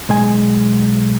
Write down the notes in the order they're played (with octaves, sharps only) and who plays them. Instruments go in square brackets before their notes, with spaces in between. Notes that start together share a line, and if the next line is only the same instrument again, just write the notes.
[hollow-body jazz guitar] B1 G#3 G#5